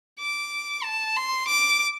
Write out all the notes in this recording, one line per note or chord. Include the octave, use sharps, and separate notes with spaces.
D6
A5
C6
D6